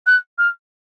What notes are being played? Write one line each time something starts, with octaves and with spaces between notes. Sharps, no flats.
F#6
F6